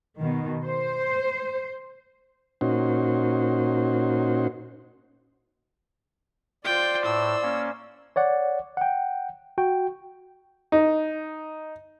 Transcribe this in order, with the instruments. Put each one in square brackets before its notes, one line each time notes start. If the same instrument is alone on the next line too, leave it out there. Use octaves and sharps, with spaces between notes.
[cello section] B2 D#3
C5
[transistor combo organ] A#2 C#4 D#4 F#4 C5
[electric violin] F4 G5 [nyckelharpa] C5 D5
[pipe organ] A2 [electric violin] E6
[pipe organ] A#3 C#4
[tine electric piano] C#5 D5 F#5
F#5 G5
F#4 G5
[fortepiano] D#4